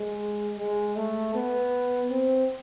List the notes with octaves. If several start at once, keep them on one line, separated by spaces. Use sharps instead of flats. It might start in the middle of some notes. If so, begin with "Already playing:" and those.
Already playing: G#3
G#3
A3
B3
C4